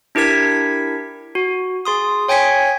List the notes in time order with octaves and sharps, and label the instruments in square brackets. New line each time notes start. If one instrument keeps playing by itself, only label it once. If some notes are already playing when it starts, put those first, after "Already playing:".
[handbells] D4 E4 G4 A#4 G#6 B6
F#4
G#4 C6 D#6
C#5 G5 G#5 G#6 B6 C#7